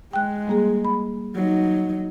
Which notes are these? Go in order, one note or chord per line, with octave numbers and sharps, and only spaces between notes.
G#3 G5 F#6
G3 A#3 G#4
B5
F#3 D#4